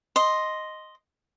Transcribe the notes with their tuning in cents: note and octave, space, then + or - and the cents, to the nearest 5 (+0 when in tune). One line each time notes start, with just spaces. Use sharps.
D#5 +0 C6 +0